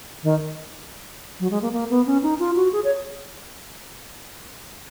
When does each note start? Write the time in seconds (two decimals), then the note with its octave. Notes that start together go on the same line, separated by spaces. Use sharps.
0.23 D#3
1.40 F#3
1.51 G#3
1.62 A#3
1.73 A#3
1.90 B3
2.06 C#4
2.23 D#4
2.39 F4
2.56 F#4
2.73 G#4
2.84 C#5